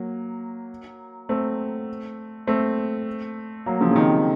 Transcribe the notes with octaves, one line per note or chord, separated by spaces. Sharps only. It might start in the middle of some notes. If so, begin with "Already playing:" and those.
Already playing: F#3 A#3
A3 C4
A3 C4
F#3 A#3
C#3 F3
C#3
C3 D#3